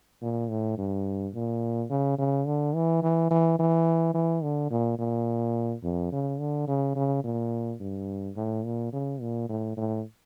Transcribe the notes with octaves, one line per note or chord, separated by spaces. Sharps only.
A#2
A2
G2
A#2
C#3
C#3
D3
E3
E3
E3
E3
E3
D3
A#2
A#2
F2
C#3
D3
C#3
C#3
A#2
G2
A2
A#2
C#3
A#2
A2
A2